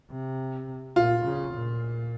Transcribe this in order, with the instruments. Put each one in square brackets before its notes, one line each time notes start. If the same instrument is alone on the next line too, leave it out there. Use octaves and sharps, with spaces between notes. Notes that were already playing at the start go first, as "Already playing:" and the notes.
[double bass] C3
[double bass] A#2 [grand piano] F4
[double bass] C#3
A#2